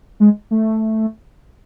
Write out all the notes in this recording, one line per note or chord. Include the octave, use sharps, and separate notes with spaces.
G#3
A3